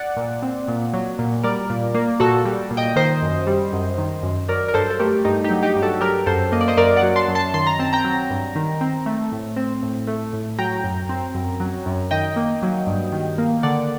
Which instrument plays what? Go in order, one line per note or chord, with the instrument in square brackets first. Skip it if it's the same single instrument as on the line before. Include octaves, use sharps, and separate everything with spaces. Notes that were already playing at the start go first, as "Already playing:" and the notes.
Already playing: [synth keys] D5 F#5
A#2
C4
A#2
F#3
A#2
G3 A#4 D5
A#2
A#3
A#2 F#4 A4
G3
A#2
D#5 G5
D#3 C5 D#5
F#2
G3
F#2
D#3
F#2
F#3 A#4 D5
A#4
G2 A4 C5
A4
A3 G4 A#4
G2 D#4 G4
D#4 G4
F#3
D#4 G4
G2
F#4 A4
F#3 G4 A#4
F#2 A4 C5
A#3 D#5
D5
C5 D#5
F#2 A#4 D5
D5 F#5
F#3
A5 C6
F#2
A5 C6
D#3 C6
A#5
C4 A5
G5 A#5
F#3
G2
D#3
C4
A3
A2
C4
A2
A3
A2
F#3 G5 A#5
F#2
C4
F#2
F#3
F#2
D#3 D#5 G5
A#3
F#3
G2
D#3
A#3
D3 D5 F#5